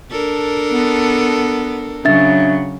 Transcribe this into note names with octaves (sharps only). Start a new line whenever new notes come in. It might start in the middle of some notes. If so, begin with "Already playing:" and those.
D4 A4 A#4
B3
C#3 F#3 D4 E5 A6